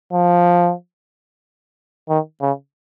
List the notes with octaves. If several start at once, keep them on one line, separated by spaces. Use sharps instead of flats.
F3
D#3
C#3